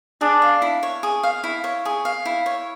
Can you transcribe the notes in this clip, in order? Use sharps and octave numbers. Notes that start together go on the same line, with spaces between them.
D4 G#4
F5
E4
C#5
G#4
F5
E4
C#5
G#4
F5
E4
C#5